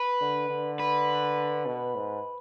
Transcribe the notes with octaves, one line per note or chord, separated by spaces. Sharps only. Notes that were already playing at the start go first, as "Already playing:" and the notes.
Already playing: B4
D3
D3
B4
B2
G#2